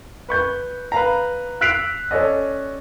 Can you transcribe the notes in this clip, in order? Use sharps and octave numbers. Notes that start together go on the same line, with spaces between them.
B4 C#6 G6
B4 F5 A#5
E6 F#6 B6 C7 D7 F7
C#4 A4 D5 D#5